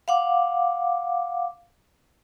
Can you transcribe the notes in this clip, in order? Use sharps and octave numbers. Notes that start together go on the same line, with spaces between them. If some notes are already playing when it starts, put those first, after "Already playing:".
F5 F#5 D6